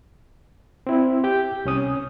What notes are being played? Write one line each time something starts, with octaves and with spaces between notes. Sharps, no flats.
C4 E4
G4 G5 G6
C2 C#4 D#6